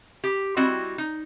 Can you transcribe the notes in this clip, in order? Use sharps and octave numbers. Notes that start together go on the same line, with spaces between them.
G4
G3 C4 E4 F#4 D#5
D#4